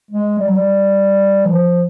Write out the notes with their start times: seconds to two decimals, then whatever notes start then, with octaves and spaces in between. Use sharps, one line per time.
0.11 G#3
0.39 G3
0.48 F#3
0.56 G3
1.45 E3
1.53 F3